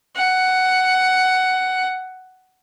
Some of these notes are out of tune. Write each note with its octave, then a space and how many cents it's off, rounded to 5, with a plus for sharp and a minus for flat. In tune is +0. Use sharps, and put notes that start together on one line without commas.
F#5 +10